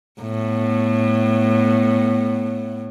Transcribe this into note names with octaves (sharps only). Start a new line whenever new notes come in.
A2 B3